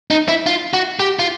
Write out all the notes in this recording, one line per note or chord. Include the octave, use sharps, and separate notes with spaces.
D#4
E4
F4
F#4
G4
F4